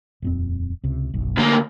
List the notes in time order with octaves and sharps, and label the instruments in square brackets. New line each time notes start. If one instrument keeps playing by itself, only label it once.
[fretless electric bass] D#1 F2 C4
C#2 C3
F#1 B1
[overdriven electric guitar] D2 A#3 [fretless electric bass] D3